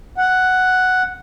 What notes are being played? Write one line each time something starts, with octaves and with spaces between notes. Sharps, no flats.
F#5